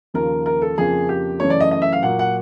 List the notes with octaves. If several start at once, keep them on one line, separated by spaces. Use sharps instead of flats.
D#2 C#3 F3 A#3 A#4
A#4
A4
F2 C#3 F3 A#3 G#4
G4
F#2 C#3 E3 A3 C#5
D5
D#5
D#5
E5
F5
A#2 F#3 A#3 F#5
F#5